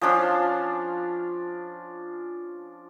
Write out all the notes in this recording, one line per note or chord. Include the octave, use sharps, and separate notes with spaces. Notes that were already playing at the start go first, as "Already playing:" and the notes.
F3 C#4 D4 F4